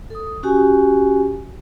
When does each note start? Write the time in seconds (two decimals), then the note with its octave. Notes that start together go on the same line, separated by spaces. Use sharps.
0.10 A4 D#6
0.43 C#4 F#4 G4 G#5